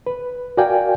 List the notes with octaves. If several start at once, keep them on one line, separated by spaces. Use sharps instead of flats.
B4
F#4 A#4 D5 F5 G5 G#5